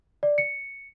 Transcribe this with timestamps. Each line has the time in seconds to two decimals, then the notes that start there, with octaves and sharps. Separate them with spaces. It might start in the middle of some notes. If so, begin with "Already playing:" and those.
0.23 D5
0.38 C#7